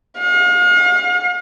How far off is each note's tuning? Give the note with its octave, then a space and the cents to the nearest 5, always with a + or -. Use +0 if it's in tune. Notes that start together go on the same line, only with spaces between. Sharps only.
F5 +40